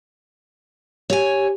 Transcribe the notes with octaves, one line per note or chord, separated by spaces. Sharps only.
G4 C#5 G#5